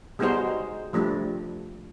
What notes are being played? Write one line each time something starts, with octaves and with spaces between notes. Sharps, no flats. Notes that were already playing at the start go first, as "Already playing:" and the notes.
G3 G#3 B3 D#4 F#4 C5
F3 G3 A3 D4